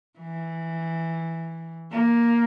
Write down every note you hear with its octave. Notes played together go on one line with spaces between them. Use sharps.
E3
A#3